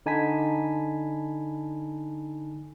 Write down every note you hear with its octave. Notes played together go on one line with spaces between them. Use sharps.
D3 D#4 G#5 A5 B5 B6